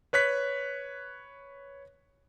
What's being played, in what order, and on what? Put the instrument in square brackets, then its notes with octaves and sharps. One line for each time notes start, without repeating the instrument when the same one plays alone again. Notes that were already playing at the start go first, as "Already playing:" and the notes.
[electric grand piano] B4 C#5 F#6 B6